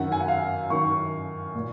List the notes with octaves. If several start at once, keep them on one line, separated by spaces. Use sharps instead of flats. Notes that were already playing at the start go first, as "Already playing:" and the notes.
Already playing: F#2 D#3 F#5
G#5
F#5
F5
F#2 D#3 C#6
A#2